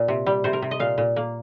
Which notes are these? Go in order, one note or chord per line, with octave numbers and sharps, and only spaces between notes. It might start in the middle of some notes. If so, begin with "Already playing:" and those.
Already playing: A#2
C3
G3
C3 C5
A#4
C3
D#5
A#2 F5
A#2
A#3